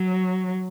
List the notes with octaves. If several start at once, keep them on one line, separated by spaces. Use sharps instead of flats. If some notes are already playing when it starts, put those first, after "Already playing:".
Already playing: F#3